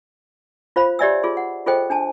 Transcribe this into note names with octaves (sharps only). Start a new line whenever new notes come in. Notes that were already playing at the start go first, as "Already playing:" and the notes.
F4 C5 F5 B5
G4 C#5 D5 E5 G#5 E6
F4 G#4 C6
F#5
F4 G#4 A4 C5 D#5 G5
D4 G#5 A5